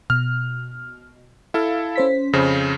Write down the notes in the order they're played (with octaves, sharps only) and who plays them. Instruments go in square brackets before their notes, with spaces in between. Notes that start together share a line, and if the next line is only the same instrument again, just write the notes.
[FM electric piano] B2 [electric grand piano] F6
[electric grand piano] E4 A4 [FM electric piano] F5
[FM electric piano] C#4 C5 B6
[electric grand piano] F2 C#3 C5 [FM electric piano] A#6